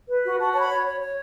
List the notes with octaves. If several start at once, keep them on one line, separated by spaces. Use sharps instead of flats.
B4
F#4
F#4 A5
C#5 A5
B5
C#5
C#5
C#5